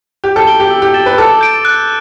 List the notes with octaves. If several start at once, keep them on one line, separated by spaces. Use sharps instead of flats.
G4 G6
A4
D7 G7
G4
E6
G4
A6 E7 G7
B4
A4 D6
G6 D7
F#6